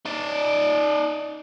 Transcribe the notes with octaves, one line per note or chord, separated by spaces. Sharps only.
D#4 D5